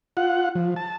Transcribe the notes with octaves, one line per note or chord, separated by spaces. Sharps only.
F4 F#5
F3
A5